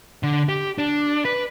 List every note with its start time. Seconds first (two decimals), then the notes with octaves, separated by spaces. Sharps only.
0.23 D3
0.49 G4
0.78 D4
1.25 B4